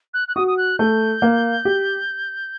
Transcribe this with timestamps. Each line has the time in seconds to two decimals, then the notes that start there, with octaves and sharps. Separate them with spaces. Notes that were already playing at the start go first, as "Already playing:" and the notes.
0.14 F#6
0.28 F#6
0.36 F#4 D#6
0.48 D#6
0.57 F#6
0.79 A3 G6
1.22 A#3
1.65 G4